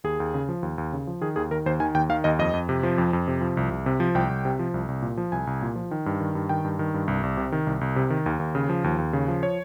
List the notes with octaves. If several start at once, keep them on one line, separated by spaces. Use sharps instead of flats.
D#2 G#4
D#2
C#3
F3
D#2
D#2
C#3
F3
D#3 G#4
D#2 G#4
D#3 A#4
D#2 C5
D#3 G#5
D#2 G5
D#3 F5
D#2 D#5
F2 D#5
F2
C3
F3
F2
F2
C3
F3
C2
C2
C3
F3
C2 G5
C2
C3
F3
C2
C2
A#2
F3
C2 G#5
C2
A#2
F3
D#3
G2
D#3
G2
D#3 G5
G2
D#3
G2
C2
C2
C3
D#3
C2
C2
C3
D#3
D#2
D#2
C#3
F3
D#2
D#2
C#3
F3
C#5